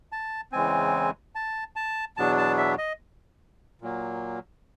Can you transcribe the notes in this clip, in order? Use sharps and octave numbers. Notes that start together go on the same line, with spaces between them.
A5
E2 C#3 E3 G#3 C4 G#5
A5
A5
E2 B2 F#3 B3 D4 A5
A5
E5
D#5
A#2 F#3 A#3